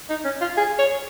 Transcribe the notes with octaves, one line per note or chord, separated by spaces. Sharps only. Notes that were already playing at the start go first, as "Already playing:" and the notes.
D#4
C#4
F4
G#4
C#5